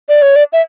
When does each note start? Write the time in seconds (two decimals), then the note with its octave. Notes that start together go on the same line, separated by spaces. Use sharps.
0.09 D5
0.22 C#5
0.36 D5
0.53 E5